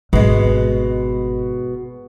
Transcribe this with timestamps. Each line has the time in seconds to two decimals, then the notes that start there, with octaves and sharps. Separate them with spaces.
0.13 G#1 B2 G#3